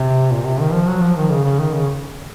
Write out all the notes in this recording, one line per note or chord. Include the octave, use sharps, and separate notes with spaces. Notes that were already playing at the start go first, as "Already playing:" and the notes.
Already playing: C3
A#2
C3
D#3
F3
F#3
F3
D#3
C#3
C#3
D#3
C#3